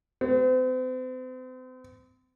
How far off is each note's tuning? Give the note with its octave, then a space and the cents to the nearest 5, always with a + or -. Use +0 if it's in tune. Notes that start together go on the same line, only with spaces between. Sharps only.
C4 -40